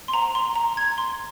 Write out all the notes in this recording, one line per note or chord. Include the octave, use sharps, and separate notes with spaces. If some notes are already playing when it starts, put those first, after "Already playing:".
C6
C5 F#5 A#5
C6
A#5
G#6
C6